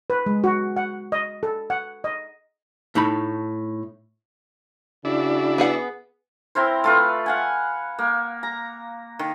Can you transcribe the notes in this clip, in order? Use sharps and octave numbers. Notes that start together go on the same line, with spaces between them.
B4
G#3
F#4
F#5
D#5
A4
F#5
D#5
A2 A3 D#4 B5
C#3 D4 E4 F#4
B3 G#4 F#5
C4 E4 A#4 C5
A3 F4 B4
F5 F#5 G#5
A#3
A#5
D#3